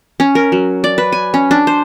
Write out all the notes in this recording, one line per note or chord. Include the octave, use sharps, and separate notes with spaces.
C#4
A#4
F#3
D5
B4
G#5
C#4
D4
C5